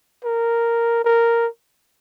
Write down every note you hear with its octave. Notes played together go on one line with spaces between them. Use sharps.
A#4
A#4